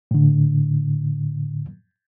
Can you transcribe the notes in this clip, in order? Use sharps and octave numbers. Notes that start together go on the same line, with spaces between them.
A2 D3